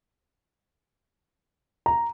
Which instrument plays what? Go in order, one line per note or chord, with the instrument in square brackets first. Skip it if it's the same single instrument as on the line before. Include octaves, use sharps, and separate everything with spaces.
[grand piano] A#5